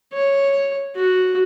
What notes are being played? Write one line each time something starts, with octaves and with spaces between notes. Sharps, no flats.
C#5
F#4